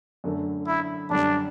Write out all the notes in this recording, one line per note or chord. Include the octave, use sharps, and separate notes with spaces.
F#2 D3 A3
E4
F#2 D3 G3 D4